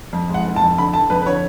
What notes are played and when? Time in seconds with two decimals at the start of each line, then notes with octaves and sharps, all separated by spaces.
0.13 F2
0.29 G#3
0.34 F#5
0.45 F1
0.56 A5
0.62 F2
0.78 D3 B5
0.94 F1 A5
1.10 F2 B4
1.22 B4
1.26 D3 C#5